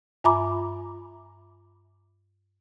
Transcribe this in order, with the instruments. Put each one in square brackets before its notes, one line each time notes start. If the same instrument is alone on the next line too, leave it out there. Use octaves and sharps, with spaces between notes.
[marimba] G2 F4 E5 A#5 B5 D6